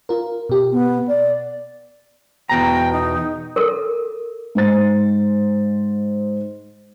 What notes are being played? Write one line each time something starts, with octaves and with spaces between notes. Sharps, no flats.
F4 A#4
B2 G4
B3
D5
E2 B2 G5 A#5
D#4
A4 A#4
G#2 C5 A6